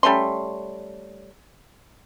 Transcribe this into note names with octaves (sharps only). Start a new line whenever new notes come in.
G3 A3 C#4 C6